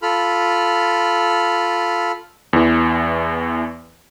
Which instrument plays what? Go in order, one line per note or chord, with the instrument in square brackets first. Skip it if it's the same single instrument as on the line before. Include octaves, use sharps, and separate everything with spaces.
[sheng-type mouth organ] F4 A4 B5 F6
[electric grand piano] E2 E3